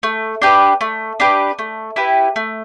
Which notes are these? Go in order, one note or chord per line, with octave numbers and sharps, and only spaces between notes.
A3
D4 G4 B4
A3
D4 G4 B4
A3
E4 G4 B4
A3